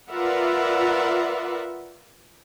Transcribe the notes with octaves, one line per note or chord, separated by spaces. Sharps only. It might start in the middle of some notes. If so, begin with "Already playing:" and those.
F4 A#4 B4 D5 E5 F#5